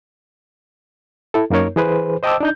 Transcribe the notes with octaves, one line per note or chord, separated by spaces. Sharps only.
E4 A4
F#2 A#3 D#4 A#4 C#5
E3 G#4 B4 C5
C5 D#5 G5 A5 D6 E6
D4 D#4 G6